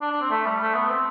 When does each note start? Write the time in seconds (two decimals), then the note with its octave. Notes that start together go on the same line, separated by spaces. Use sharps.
0.01 D4
0.12 D4
0.21 C4
0.31 A3
0.46 G3
0.60 A3
0.74 B3
0.90 C4